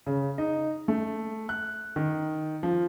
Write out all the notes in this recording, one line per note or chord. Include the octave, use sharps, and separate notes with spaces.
C#3
D#4
A3
F#6
D#3
F3